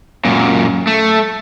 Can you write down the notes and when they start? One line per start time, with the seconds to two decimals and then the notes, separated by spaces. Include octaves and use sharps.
0.25 F#2 A#2
0.87 A3